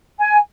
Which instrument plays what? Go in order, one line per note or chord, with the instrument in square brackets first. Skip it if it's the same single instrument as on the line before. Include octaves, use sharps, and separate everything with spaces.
[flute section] G#5